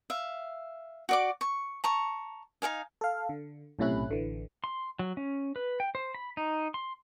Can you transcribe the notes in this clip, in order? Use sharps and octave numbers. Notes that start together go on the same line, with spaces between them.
E5 F5
F#4 D5 D6
C#6
A5 A#5 C#6
D#4 A#4 F5 G#5
A4 F5
D3
B1 A2 C3 C#4 E4 F#6
A1 D3 E3
C6
F#3
C#4
B4
G5
C5
B5
D#4
C6